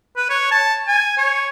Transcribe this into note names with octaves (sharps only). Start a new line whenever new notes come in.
B4
C#5
A5
G#5
C#5